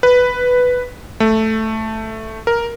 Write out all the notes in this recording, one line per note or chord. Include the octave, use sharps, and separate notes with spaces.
B4
A3
A#4